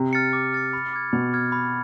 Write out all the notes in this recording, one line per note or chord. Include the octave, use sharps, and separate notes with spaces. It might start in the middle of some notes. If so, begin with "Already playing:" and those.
Already playing: C3
F6 A6 C#7
D6
F6 A6 C#7
B5
D6 F6 G#6
B2 B5
D6 F6 G#6
B5